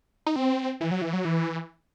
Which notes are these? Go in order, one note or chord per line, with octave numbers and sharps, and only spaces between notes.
D#4
C4
E3
F#3
E3
F#3
E3